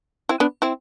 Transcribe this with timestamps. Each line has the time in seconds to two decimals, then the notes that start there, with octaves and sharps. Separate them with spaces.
0.29 C4 E4
0.40 B3 D4
0.62 C4 E4